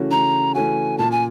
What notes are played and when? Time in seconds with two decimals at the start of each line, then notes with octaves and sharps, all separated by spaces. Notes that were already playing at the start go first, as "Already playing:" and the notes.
Already playing: C#3 E3 A3 C#4 F#4
0.11 C#3 A#5
0.54 E3 A3 C#4 F#4 G#5
0.98 A#2 A5
1.11 G#5